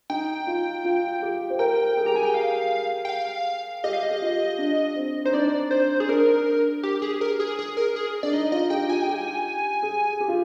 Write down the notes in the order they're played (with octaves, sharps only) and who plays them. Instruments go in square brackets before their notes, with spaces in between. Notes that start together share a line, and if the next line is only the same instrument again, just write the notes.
[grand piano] D#4 [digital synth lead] G5
[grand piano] F4
F4
G4
C5
[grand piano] A#4 [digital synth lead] G5
[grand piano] G#4
[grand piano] G4 [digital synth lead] A#5
[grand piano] G#4 [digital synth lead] G#5
[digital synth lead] G5
F5
G5
F5
[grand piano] G4 [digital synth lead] D#5
[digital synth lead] F5
D#5
[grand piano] G4
F4
D4
C4
[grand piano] D#4 [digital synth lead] C5
[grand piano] D4 [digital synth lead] D5
[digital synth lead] C5
G#4
[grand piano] D4 [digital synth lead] A#4
[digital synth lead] G4
G#4
A#4
G#4
G#4
A#4
G#4
[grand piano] D4 [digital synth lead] D5
[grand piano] D#4 [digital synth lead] D#5
[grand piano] F4 [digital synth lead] D#5
[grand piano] G4 [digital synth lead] G5
[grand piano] F4 [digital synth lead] G#5
[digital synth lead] G5
[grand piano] G4
[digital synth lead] G#5
[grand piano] G#4
G4
F4